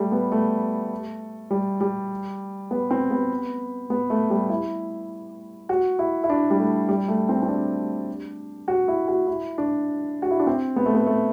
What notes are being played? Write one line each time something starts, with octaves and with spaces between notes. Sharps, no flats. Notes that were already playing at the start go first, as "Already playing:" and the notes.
Already playing: G3 A3
B3
A3
G3
G3
B3
C4
B3
B3
A3
G3
E4
F#4
E4
E4
D4
G3
A3
G3
A3
C4
C4
D4
F#4
E4
F#4
E4
D4
F#4
E4
D4
C4
B3
A3
B3
A3